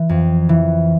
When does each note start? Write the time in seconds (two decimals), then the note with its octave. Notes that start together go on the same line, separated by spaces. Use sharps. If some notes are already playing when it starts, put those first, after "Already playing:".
Already playing: E3
0.09 F2
0.49 E3